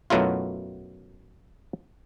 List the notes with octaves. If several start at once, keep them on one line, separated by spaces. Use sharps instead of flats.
F#2 B2 F#3 A3 E4 F4